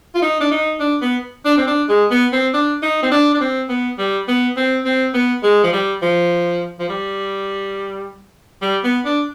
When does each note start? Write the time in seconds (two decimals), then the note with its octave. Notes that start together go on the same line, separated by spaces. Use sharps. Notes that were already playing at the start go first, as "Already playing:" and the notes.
0.15 F4
0.22 D#4
0.41 D4
0.51 D#4
0.80 D4
1.01 B3
1.45 D4
1.57 C4
1.67 D4
1.89 G#3
2.11 B3
2.33 C4
2.53 D4
2.83 D#4
3.03 C4
3.11 D4
3.35 D4
3.40 C4
3.69 B3
3.98 G3
4.28 B3
4.57 C4
4.85 C4
5.14 B3
5.43 G#3
5.64 F3
5.72 G3
6.02 F3
6.79 F3
6.89 G3
8.62 G3
8.84 B3
9.05 D4